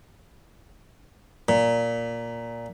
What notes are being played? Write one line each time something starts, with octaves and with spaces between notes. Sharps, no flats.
A#2